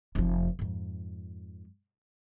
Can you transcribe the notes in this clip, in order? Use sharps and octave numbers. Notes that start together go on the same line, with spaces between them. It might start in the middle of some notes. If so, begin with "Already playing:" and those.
F1 F3
F2 G#2